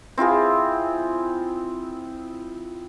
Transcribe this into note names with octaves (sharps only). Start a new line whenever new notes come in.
C4 E4 F4 G#4